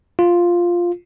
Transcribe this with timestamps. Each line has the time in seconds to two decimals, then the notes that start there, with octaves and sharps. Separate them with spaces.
0.19 F4